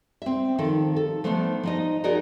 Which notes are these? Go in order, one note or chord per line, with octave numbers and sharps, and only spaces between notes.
C4 E5
D#3 F3 A4
A4
F3 A3 B3 D4 D#4
F3 D#4 D#5
D#4 F#4 G#4 A#4 D5 D#5